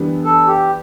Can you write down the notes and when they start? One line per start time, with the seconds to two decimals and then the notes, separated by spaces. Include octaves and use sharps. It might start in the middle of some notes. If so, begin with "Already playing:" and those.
Already playing: E3 G3 B3 D4
0.24 A4
0.47 G4